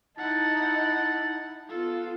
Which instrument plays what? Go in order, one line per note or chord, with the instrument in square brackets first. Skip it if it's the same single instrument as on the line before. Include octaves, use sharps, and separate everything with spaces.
[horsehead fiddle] D#4 [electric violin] E4 F#5 [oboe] A5
[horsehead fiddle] B3 F4 [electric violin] A4